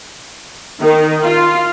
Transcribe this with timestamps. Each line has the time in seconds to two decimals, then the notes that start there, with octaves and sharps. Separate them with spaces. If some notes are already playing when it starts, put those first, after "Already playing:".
0.81 D#3
1.24 F4